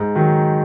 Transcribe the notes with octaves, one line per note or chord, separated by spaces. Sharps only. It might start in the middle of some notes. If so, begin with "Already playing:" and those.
Already playing: G#2
D#3 F#3